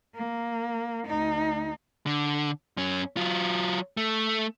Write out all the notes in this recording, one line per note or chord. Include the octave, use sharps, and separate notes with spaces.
A#3
D2 D#4
D3
F#2 C#4
F#3 F4
A3